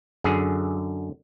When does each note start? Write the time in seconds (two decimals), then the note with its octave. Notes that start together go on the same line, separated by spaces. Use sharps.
0.24 F#2 D3 G#4